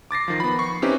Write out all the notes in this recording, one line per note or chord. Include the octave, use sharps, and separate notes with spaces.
D6 A6 A#6 C7
D#3 F3
B3 B5
C#6 C7
C4 C#4 D#4 E4 G4 B4